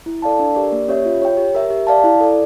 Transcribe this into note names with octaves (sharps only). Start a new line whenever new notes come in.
E4
A4 D5 F5 A5
D4
G4 A#4 D5
A#3
C#4 G4 C#5 E5
F4
C#5 G5
G4
A#4 E5
G4
D5 F5 A5
E4
A4 D5